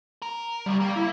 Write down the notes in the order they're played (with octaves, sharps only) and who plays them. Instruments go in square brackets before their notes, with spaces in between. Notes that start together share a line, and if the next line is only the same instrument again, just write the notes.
[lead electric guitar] A#4
[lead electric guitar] C2 C#3 [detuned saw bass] G3
[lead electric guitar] A#3
[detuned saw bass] E4